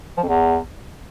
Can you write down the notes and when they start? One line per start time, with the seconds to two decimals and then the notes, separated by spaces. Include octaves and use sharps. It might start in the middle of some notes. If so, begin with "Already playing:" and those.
0.18 F3
0.23 F2
0.28 E2